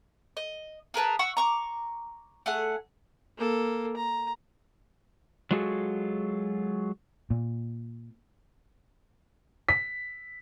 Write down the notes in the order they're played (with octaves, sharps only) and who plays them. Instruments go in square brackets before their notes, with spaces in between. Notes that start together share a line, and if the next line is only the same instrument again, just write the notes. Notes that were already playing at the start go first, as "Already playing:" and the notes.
[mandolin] D#5
G#4 A#4 B4 A5
F#5 C#6 E6
A#5 C#6 D6
A3 G#4 F#5
[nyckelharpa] A#3 A4
A#5
[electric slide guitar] F#3 G#3 F4 F#4 G#4 A4
[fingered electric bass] A#2
[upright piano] B6